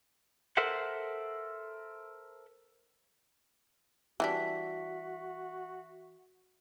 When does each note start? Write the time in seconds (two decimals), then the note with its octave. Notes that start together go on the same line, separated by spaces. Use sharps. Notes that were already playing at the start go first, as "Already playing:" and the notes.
0.57 A4 A#4 C5 E5 F#5
4.20 E3 G3 D4 F#4 E5 B6